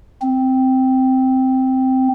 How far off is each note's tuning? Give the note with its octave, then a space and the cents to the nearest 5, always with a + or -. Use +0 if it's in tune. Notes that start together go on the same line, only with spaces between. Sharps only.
C4 -5